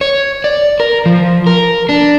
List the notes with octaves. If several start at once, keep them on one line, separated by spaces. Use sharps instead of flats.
C#5
D5
A#4
F3
A#4
D4